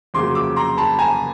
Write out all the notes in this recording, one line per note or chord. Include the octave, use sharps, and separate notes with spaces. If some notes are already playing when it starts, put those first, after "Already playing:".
F2 C#3 F#3 A#3 C6 D6
D6 E6
A#5 C6
A5 B5
G#5 A#5